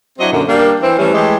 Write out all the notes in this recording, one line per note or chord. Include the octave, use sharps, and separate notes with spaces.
F#3 C4 D4 E4 D#5
F#2 A#2 D3
G3 A#3 D4
E3 C4
E3 G3 A3 C#4
E3 G#3 A3 G4